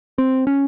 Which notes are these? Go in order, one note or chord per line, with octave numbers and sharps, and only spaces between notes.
C4
C#4